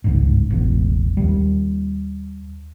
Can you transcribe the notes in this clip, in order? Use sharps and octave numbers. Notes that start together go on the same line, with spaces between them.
G1 C#2 G#2
E1 A1 E2
D#2 G3